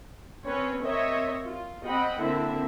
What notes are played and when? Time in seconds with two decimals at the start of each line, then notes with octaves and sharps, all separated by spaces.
0.46 C4 C#4 B4 C#5
0.82 C4 A#4 C#5 D#5 E5
1.44 F4
1.85 C4 D#5 F#5 G5 B5
2.19 D3 A#3 C4 E4 E5